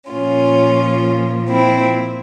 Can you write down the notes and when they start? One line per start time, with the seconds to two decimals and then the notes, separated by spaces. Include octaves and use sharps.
0.10 A#2 F3 C#4 F4
1.49 C4 E4